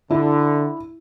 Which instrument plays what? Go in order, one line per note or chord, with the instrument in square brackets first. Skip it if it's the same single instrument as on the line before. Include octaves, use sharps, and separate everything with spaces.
[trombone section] D3 [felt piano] E4